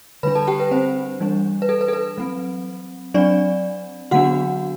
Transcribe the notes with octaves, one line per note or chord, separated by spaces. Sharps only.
D3 G3 D4 B4 B5
A4 A5
G4 G5
B4
C4 C5
E3 G3 D4
B4
A4
B4
A4
B4
F#3 C4
F#3 C4 D4 D5
D3 F#3 B3 D4 F#4 F#5